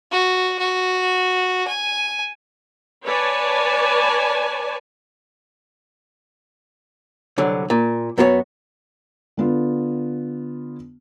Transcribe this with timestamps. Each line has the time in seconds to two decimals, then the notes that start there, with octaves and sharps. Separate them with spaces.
0.12 F#4
0.59 F#4
1.67 G#5
3.05 B4 C#5 D5 G#5 A5
7.38 C2 D3 F#3
7.70 A#2
8.18 F#2 B3 F#4 G4 C#5
9.37 D3 B3 F4